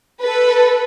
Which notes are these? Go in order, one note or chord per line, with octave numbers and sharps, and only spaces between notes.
A4 B4